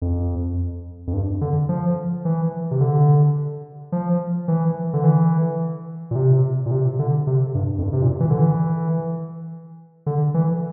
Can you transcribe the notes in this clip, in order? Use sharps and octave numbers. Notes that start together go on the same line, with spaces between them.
F2
F2
G2
D3
F3
E3
C3
D3
F3
E3
D3
E3
A#2
C3
A#2
C3
D3
C3
G2
F2
G2
C3
A#2
E3
D3
E3
D3
E3